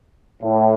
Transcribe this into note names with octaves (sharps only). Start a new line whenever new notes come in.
A2